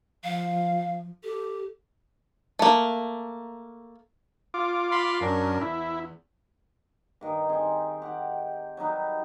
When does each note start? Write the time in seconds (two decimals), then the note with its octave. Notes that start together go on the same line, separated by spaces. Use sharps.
0.24 F3 F5
1.24 G4 A4
2.59 A3 A#3
4.54 F4 D6
4.92 F5 B5 C6
5.21 F#2 C#4 D4 A#4
5.62 E2 E4
7.21 G2 D#3 D#4
7.48 C4 D#4 G#4
8.02 G4 F#5
8.77 F#3 G3 D#4 B4